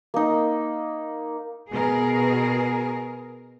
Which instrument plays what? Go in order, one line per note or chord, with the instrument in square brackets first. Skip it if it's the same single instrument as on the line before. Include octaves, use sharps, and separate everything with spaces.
[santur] A#3 D#4
[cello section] B2 G#4 A#4